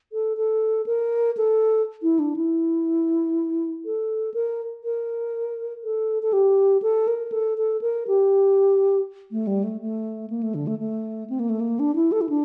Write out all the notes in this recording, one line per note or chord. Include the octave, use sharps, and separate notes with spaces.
A4
A4
A#4
A4
E4
D4
E4
A4
A#4
A#4
A4
A4
G4
A4
A#4
A4
A4
A#4
G4
A3
G3
A3
A3
A#3
A3
D3
A3
A3
C4
A#3
A3
A#3
D4
E4
A4
E4
D4